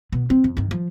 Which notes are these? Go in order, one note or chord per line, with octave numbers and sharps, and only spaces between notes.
B2 B3
C4
F2
G2 D#3
F3